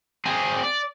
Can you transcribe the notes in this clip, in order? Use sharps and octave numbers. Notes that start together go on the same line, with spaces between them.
C4 G#4
D5